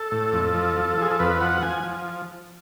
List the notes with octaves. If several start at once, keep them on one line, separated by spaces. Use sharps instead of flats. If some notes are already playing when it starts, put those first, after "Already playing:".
Already playing: A4
A2
F2
F3
F3
F3 G#4
A4
F2 B4
F3 F#5
F3 G#5
F3